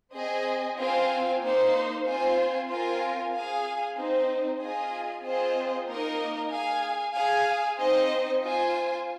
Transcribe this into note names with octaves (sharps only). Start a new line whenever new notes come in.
C4 G#4 D#5 G#5
C4 F4 C5 F5 G#5
A#3 D#4 C5
C4 F4 C5 G#5
C4 F4 A#4 G#5
G#4 F5 G#5
C4 D#4 C5
F4 G#4 D#5 G#5
C4 F4 G#4 C5 D#5
A#3 D#4 A#4 D#5
G#4 F5 G#5
G#4 F5 G#5
C4 D#4 C5 D#5
F4 C5 G#5